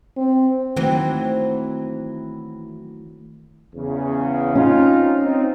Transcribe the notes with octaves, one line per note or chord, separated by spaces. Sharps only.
C4
D#3 E3 F#3 A3 C4
E2 C#3
C4 C#4 D#4 F4
C4 D#4